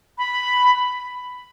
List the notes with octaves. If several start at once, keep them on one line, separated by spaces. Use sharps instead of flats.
B5